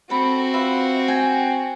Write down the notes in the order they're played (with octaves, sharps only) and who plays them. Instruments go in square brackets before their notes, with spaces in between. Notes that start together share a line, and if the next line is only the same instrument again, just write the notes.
[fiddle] C4 F#4 [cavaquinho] A4 B5
[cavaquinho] F4 B4 E5
G5 G#5